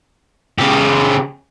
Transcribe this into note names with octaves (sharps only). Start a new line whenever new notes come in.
C#3 G4